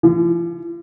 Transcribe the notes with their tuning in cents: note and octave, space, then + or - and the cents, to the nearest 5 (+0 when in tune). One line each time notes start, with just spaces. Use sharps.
F3 -45